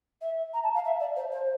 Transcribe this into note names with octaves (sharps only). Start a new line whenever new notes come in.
E5
A#5
A5
F5
E5
D5
C5
C5